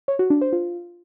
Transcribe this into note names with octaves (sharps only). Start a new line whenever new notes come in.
C#5
F#4
D4
C5
F4